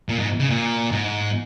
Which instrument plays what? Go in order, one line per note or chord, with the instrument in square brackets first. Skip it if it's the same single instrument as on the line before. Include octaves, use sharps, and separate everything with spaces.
[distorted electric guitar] A#2
G#2
C#3
A#2
G#2